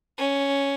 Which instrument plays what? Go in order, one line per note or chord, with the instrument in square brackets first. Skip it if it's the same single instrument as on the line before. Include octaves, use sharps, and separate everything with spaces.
[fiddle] C#4